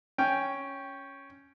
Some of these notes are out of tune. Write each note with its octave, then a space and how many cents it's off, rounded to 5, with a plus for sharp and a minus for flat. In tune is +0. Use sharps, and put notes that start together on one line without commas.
C#4 +0 G5 +0